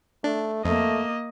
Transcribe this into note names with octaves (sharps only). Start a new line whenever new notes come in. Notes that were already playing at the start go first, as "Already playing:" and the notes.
A3 D4
F2 A3 A#3 D#5